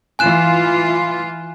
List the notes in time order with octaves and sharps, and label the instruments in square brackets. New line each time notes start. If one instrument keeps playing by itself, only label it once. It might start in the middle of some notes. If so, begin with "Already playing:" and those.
[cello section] E3 F4 [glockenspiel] G#5 F#6 E7